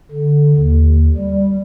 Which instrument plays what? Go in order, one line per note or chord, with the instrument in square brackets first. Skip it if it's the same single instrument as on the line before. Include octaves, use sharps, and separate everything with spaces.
[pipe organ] D3
D#2
G3